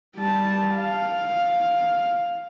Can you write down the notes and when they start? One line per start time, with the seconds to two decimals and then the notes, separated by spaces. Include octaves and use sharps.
0.16 G3 A5
0.75 F5